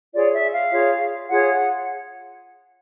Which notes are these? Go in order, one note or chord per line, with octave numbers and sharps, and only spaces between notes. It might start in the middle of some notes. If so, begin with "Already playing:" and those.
F4 G#4 C#5 D5
E5
F5
F4 G#4 C#5
F4 G#4 C#5 F#5